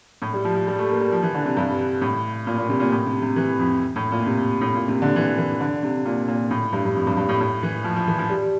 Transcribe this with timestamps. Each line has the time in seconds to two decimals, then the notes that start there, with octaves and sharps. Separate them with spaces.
0.22 A2
0.33 G3
0.45 F3
0.56 F3
0.67 G3
0.79 A3
0.89 A#3
1.01 G3
1.12 F3
1.23 E3
1.35 D3
1.46 C3
1.57 G2
2.01 A2
2.47 A#2
2.58 A#2
2.69 C3
2.80 A#2
2.92 A2
3.06 C3
3.22 C3
3.36 E3
3.59 F2
3.96 A2
4.12 A#2
4.26 C3
4.61 A2
4.75 A#2
4.88 C3
5.02 D3
5.16 E3
5.38 E3
5.61 D3
5.83 C3
6.05 A#2
6.28 A#2
6.51 A2
6.73 G2
6.85 G2
6.96 F2
7.07 G2
7.17 G2
7.29 A2
7.40 A2
7.63 E3
7.84 F3
7.96 F3
8.07 E3
8.19 F3
8.29 G3